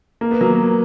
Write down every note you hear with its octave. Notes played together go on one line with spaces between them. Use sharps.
A#3
B3
F#3 A#3